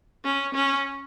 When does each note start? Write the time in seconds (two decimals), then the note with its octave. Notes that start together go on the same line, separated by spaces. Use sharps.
0.25 C#4
0.55 C#4